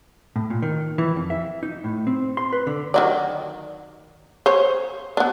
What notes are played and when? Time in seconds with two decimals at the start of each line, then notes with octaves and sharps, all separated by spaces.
0.36 A2
0.50 A#2
0.62 D#3
0.98 E3
1.16 F2
1.30 E5
1.63 D#4
1.84 A2
2.07 C4
2.37 C6
2.53 B4
2.67 D3
2.94 D#3 F#3 D5
4.46 C5 C#5
5.17 B3 D4